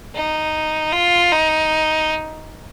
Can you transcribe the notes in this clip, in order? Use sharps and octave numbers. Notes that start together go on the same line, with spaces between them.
D#4
F4
D#4